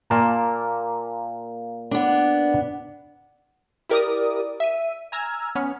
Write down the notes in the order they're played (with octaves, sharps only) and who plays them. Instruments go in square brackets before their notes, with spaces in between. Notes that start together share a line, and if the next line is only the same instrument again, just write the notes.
[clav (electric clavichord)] A#2 A#3 A5
[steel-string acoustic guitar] B3 D4
[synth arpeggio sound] E4 G4 A#4 D5 D6 D#6
E5 D#7
G#5 A#5 E6 F6 G#6
B3 C#4 C#5 F6